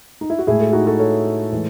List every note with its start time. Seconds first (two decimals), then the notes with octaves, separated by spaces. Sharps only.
0.21 D#4
0.30 E4
0.39 F#4
0.47 A2 G#3 E4 G#4
0.60 F#4 A4
0.73 D#4 F#4
0.87 F#4 A4
0.99 A4 C#5
1.52 A2 E3 G#3